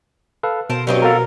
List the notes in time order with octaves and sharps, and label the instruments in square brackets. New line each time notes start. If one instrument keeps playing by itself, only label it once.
[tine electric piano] A4 B4 F5
[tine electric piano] B2 [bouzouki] A#4 C5 A5
[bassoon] G2 [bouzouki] F#3 C4 D#5
[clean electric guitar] B3 A4 F5 [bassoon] A#4